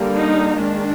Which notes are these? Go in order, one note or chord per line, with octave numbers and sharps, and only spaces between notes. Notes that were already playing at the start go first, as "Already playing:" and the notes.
Already playing: D3 G3 A#3
D#4
D#3 G#3 D4